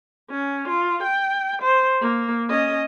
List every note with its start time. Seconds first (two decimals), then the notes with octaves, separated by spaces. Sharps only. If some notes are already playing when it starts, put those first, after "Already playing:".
0.30 C#4
0.68 F4
1.04 G5
1.62 C5
2.01 A#3
2.50 C#4 D#5